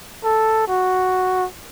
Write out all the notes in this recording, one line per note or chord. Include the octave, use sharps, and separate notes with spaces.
A4
F#4